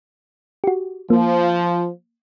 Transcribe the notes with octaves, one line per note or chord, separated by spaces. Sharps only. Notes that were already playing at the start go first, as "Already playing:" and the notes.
F#4 G4
F3 A#3